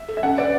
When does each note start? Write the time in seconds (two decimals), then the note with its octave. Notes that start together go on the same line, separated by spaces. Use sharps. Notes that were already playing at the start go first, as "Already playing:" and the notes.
Already playing: E5
0.09 A4
0.17 E5
0.23 C#4 F#5
0.38 B4 D5